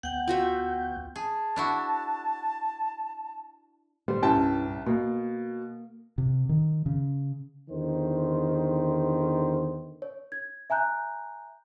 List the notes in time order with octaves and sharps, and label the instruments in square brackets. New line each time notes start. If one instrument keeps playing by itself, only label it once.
[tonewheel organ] D2 B3 G6 [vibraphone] F#5 G5
[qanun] F4 F#4 E5
[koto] G#4 [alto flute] A5
[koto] D4 E4 F#4
[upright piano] G3 [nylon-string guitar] C5
[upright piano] C2 G5 A5 [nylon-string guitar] G2 C#4 E4
[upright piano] B2 [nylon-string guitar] A#3
[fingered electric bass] C3
D#3
C#3
[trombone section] E2 D3 D#3 C5
[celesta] C#5
G#6
E5 G#5 A#5 F#6 G6